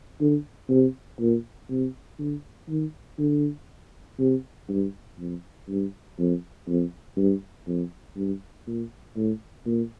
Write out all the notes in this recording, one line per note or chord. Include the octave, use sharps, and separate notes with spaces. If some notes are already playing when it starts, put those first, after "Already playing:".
D3
C3
A#2
C3
D3
D#3
D3
C3
G2
F2
G2
F2
F2
G2
F2
G2
A#2
A2
A#2